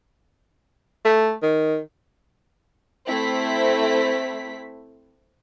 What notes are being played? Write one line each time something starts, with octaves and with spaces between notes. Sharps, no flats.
A3
D#3
A3 C4 E4 B6